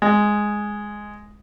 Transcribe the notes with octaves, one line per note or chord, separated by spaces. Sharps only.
G#3